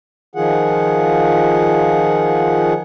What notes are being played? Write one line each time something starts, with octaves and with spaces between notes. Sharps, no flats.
D#3 F3 F4 G#4 F#5